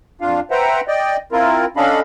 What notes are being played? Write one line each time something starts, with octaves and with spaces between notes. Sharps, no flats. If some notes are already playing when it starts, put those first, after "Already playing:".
F2 D4 F4 F5
B4 C5 E5 F#5 G5 A#5
D5 D#5 G5
C4 E4 F4 A#4
C#4 D4 A4 D#5 F5 B5